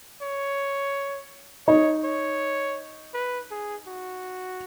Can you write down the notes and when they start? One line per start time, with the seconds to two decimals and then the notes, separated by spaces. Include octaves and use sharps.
0.21 C#5
1.67 D#4 C#5
2.04 C#5
3.14 B4
3.51 G#4
3.87 F#4